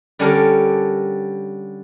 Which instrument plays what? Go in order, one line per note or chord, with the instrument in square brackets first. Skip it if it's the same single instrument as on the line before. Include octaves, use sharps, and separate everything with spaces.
[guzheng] D3 G3 C#4 G4 A4 A#4